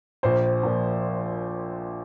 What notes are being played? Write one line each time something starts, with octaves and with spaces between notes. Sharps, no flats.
A#1 C5
A#2 F3